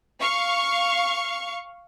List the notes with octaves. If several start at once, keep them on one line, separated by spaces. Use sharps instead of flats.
F5 C#6